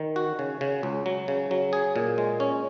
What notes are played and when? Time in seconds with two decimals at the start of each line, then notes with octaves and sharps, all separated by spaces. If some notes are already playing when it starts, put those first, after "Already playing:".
Already playing: D#3
0.16 F#4
0.39 C#3
0.61 C#3
0.83 C#2
1.06 F#3
1.28 C#3
1.51 F#3
1.73 G#4
1.96 A#2
2.18 G#3
2.40 C#4